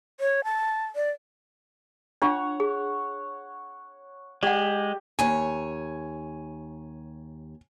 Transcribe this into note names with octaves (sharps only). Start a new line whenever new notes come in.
C#5
A5
D5
D4 F4 C#5 F#5
G#4
G#3 G4 D5 F#5
D#2 C#5 G#5